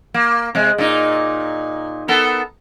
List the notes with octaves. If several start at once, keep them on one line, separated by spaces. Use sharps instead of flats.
A#3
C3 G#3
A#2 D#4
B3 A4 A#4